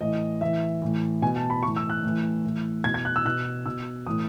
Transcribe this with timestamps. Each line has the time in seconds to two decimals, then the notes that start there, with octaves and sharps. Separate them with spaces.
0.01 A2 E3 D#5
0.41 A2 E3 E5
0.82 A2 E3
1.22 B2 G#5
1.36 A5
1.50 B5
1.63 A2 E3 C#6
1.76 E6
1.90 F#6
2.03 A2 E3
2.45 A2 E3
2.84 B2 G#6
2.94 G#6
3.05 F#6
3.16 E6
3.25 B2 F#6
3.66 B2 E6
4.07 A2 E3 D#6